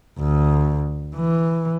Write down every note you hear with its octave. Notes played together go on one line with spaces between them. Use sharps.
D2
E3